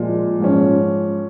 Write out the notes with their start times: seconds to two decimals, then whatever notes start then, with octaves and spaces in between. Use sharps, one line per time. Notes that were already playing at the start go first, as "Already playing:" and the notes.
Already playing: A#2 F3 G#3
0.40 G#2 F3 C#4